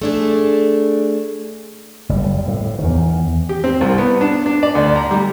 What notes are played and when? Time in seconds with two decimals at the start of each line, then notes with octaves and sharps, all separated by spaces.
0.02 A3 D4 G#4
2.09 F#1 G3
2.48 A2
2.79 E2 D#3
3.49 G4
3.64 C4
3.81 C2
3.98 B3
4.21 D4
4.46 D4
4.63 D5
4.75 D2
4.96 A#5
5.11 G3